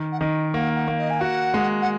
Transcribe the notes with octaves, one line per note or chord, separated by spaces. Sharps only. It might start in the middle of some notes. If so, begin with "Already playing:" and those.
Already playing: D#3
F#5
D#3 D#5
A#3 F#5
F#5
A#3
D#5
G#5
F#4 F#5
G#3
F#5